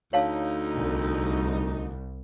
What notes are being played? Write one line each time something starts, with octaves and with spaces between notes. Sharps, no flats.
D2 D#4 C#5 F5 A5
C2